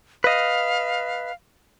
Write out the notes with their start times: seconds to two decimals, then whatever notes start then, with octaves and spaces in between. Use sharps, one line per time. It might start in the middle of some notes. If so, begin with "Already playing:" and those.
0.24 B4 D#5 F5